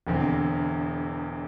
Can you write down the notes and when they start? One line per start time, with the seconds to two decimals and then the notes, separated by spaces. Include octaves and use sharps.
0.07 E1 E2 D3 C4